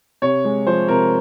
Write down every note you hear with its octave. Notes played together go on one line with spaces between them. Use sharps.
C3 C#5
G#3
F3 C5
C3 A#4